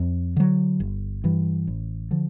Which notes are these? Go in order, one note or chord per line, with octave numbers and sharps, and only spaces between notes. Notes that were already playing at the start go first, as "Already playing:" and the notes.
Already playing: F2
D3 F#3
G1
G2 E3
A1
D3 F3